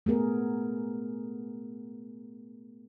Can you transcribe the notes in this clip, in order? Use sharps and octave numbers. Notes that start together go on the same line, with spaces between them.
A3 B3 G#4 A#4